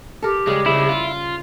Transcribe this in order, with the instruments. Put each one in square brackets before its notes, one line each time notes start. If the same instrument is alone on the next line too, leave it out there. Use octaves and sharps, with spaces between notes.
[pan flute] G4 [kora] A4 A#4
[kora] C#3 G3 [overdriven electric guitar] G#3
[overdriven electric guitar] C#2 G#3 [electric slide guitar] E4
[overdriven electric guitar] F4